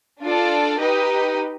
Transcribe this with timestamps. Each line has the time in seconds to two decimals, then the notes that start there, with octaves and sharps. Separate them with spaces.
0.22 D4 F4 A4 D5
0.79 D#4 G4 B4 D#5